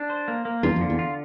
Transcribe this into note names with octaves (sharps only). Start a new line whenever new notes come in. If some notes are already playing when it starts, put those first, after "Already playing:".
Already playing: D4
C5
A#3
A#3
E2 G2 F4
F2
D3
E2
F4